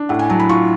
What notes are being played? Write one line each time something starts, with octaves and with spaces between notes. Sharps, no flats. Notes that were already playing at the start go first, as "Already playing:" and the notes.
Already playing: D4
A2 F#5
G#5
F#3 A5
B5
F4 C#6